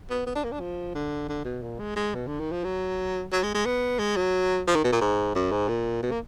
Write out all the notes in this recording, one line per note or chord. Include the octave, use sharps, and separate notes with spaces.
B3
B3
D4
A#3
D4
F3
D3
D3
B2
A#2
G#3
G#3
B2
D3
D#3
F3
F#3
F#3
G#3
G#3
B3
G#3
F#3
F3
D#3
B2
A#2
G#2
F#2
G#2
A#2
B2
A#3